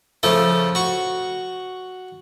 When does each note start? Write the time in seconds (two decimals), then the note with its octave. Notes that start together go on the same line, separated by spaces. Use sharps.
0.23 C#3 F3 A3 A4
0.75 F#4 C#6